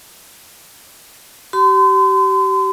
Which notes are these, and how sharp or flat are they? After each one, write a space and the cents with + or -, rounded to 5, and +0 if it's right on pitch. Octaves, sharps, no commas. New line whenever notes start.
G4 -40 C6 -40